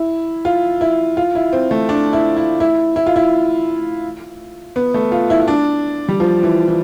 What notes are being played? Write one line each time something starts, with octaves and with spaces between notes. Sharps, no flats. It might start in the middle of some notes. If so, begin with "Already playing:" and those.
Already playing: E4
F4
E4
F4
E4
C4
A3
D4
E4
E4
E4
E4
F4
E4
B3
A3
F4
E4
E4
D4
G3
F3
E3
E3